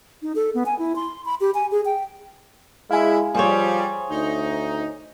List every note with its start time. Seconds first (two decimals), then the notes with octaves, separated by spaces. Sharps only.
0.22 D#4
0.35 A4
0.54 B3
0.66 G#5
0.79 E4
0.96 C6
1.25 B5
1.40 G4
1.54 G#5
1.71 G#4
1.85 G5
2.91 G#3 E4 F5 G#5
3.35 F3 G3 G#4 C5 C#5
4.10 D2 D#4